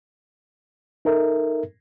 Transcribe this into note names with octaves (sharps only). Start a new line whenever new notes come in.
D#4 A4 A#4 E5